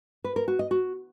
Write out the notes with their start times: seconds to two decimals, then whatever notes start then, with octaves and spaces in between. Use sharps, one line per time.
0.24 B4
0.36 A#4
0.48 F#4
0.59 D#5
0.71 F#4